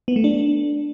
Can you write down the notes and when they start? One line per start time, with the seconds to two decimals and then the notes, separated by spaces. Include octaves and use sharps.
0.08 B3
0.16 A3
0.24 D4